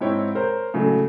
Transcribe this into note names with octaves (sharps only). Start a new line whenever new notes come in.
G#2 C4 E4 C#5 G5
A#4 C5 C#5
A2 C#3 F#3 G#3 A3